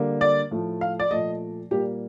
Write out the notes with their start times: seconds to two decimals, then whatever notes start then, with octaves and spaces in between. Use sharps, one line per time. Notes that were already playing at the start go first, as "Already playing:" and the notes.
Already playing: D3 G3 A#3
0.21 D5
0.51 A2 F3 A3
0.81 F5
1.00 D5
1.11 A#2 F3 A3 D#5
1.71 A#2 G3 A#3 G4